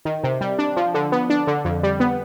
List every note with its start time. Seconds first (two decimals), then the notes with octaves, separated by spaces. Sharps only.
0.05 D#3
0.24 C3
0.41 G3
0.59 D4
0.76 F3
0.94 D3
1.12 B3
1.30 D4
1.47 D3
1.65 F2
1.83 G3
2.00 B3